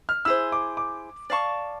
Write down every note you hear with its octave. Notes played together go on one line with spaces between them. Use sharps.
F6
E4 G#4 C5 E6
D6
D6
D5 F5 A5 C#6